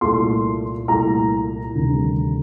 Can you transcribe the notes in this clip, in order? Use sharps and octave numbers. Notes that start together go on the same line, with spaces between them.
C2 A#2 A3 C6
C2 A#2 A3 A#5
D2 C3 D#3 G3